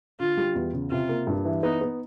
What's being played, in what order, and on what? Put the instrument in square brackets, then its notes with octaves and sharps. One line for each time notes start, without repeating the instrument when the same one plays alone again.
[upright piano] D3 [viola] F4
[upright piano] G3
E2
C#3
[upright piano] C3 [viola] F4
[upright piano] A#3
G2
E3
[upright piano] B3 [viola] D#4
[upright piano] B3